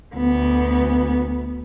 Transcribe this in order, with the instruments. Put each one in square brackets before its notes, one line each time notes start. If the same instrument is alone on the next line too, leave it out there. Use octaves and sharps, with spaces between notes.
[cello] D2 B3